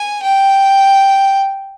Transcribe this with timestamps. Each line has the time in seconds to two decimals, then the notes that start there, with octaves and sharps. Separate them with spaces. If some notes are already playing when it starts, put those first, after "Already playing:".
Already playing: G#5
0.23 G5